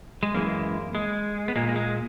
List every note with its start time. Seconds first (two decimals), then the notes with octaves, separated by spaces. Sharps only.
0.23 G#3
0.34 F#2 E3 G#3 A#3
0.95 G#3
1.48 B3
1.56 A#2 G#3 A#3
1.69 A#3
1.76 G#3